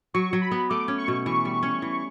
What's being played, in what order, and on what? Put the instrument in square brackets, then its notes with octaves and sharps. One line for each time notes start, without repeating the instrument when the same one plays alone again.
[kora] F#3 [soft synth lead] C#6
[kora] F#3
[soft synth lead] B5
[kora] B3
[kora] A3 [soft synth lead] D6
[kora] C#4
[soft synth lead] C#6
[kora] B2
[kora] E3 [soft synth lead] C#6
[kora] G3
C#4
E3